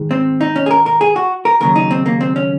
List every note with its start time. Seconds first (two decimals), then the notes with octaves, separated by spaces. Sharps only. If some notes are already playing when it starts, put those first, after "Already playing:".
Already playing: G#2 D#3 G#3
0.11 C4
0.41 D#4
0.56 C#4
0.66 G#4
0.71 A#4
0.86 A#4
1.01 G#4
1.16 F#4
1.45 A#4
1.61 D#2 C#3 F#3 A#4
1.76 D#4
1.91 C4
2.06 A#3
2.21 C4
2.36 C#4